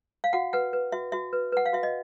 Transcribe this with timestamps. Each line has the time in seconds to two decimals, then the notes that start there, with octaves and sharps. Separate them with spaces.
0.24 F5
0.33 F#4 F#5
0.53 B4 F#5
0.73 B4
0.92 F#4 E5
1.12 F#4 E5
1.33 B4
1.52 B4 F#5
1.66 F5
1.73 F#4 E5
1.83 D#5